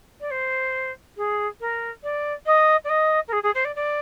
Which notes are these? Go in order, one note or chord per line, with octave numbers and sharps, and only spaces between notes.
D5
C5
G#4
A#4
D5
D#5
D5
D#5
A#4
G#4
G#4
C5
D5
D5